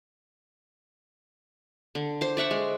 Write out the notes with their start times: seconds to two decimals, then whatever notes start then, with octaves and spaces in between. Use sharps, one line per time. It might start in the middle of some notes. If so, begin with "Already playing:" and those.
1.95 D3
2.21 C5 C6 D6
2.37 D5 E5 F#5 C#6
2.51 G#3